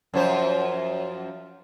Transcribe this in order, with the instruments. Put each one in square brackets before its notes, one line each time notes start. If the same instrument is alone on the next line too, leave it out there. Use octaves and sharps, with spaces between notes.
[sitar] F#2 F3 C5